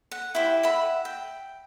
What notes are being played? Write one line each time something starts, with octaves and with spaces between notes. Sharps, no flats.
F#5
E4 G4 C5
E5 F#5 B5
G5